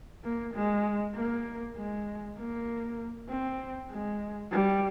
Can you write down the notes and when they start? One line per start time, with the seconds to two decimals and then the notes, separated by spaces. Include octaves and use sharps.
0.24 A#3
0.54 G#3
1.15 A#3
1.77 G#3
2.37 A#3
3.29 C4
3.90 G#3
4.51 G3